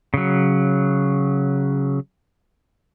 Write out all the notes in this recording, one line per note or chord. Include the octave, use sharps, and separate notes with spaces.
C#3 F#3